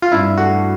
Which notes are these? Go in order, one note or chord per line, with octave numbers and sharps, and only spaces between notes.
F4
G2 E4
A3 F#4